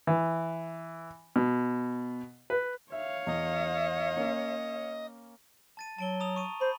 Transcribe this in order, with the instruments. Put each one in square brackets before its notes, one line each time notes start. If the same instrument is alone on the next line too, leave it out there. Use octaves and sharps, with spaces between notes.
[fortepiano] E3
B2
B4
[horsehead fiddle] C#5 F5 [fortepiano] E5
[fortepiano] E2 [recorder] D#5
[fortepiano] A#3 C#4
[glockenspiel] A5 A6 D#7
[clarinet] F#3 [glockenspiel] A5 D7 G7
[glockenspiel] A#5 D#6 F7
C#6 D#7
[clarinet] C5 [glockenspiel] B5